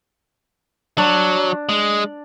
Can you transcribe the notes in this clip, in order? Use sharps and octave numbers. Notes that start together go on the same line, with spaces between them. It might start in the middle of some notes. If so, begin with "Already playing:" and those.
F#3 D4
G#3